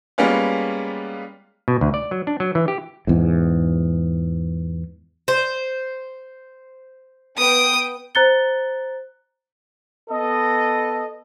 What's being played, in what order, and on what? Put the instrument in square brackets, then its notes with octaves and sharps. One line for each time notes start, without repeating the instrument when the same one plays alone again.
[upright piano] G3 G#3 A#3 B3 C#4 F4
[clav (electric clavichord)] B2
D2
D5
F#3
D4
F#3
E3
G4
[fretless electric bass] E2 G#2
[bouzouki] C5
[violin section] B3 G5 D7 [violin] D#6
[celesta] C5 A#5 F#6 A6 C#7 G7
[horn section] B3 A4 D#5